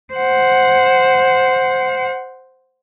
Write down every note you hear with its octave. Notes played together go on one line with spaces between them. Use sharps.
C5 F#5